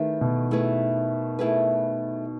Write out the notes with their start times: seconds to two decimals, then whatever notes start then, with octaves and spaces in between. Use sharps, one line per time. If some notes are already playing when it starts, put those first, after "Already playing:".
Already playing: D#3 A3 E4 G#4 B4
0.21 B2
0.51 A3 E4 G#4 B4
1.39 A3 E4 G#4 B4